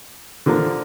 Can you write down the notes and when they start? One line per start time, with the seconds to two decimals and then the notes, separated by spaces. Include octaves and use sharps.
0.46 D3 F3 A#3